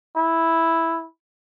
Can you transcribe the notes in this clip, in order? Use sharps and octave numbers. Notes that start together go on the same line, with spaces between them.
E4